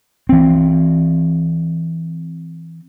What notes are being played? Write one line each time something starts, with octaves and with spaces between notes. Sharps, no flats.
E3 C4